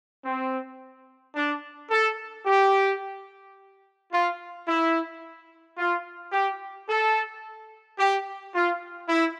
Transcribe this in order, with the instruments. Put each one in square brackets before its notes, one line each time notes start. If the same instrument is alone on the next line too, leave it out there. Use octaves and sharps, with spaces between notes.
[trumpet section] C4
D4
A4
G4
F4
E4
F4
G4
A4
G4
F4
E4